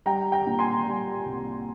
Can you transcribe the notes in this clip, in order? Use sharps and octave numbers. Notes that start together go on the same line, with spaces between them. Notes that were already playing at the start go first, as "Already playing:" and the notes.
G3 G5 A#5
G5 A#5
A#2
G#5 C6
G3
C2